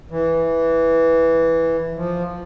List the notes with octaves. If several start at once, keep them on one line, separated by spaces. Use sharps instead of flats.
E3
F3